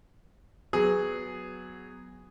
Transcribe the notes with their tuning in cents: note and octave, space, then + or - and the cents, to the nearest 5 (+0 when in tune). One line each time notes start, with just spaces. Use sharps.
F#3 +0 B3 +10 G#4 -5